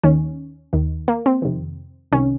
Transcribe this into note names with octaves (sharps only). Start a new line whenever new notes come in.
D#2 D#3 C#4
D#2 D#3
A#3
C4
F2 C3 D#3
C2 C3 D#3 C#4